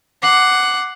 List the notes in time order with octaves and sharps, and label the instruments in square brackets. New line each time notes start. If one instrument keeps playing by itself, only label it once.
[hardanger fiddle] F#5 [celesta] D6 C7